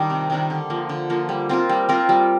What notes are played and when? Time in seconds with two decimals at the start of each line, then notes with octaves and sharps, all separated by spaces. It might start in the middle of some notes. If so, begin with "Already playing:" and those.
Already playing: D#3 G3 D4
0.10 C3
0.30 D#3 G3 D4
0.50 D3
0.70 F3 A#3
0.89 D3
1.10 F3 A#3
1.29 G3
1.49 C4 F4 A#4
1.69 G3
1.89 C4 F4 A#4
2.09 G3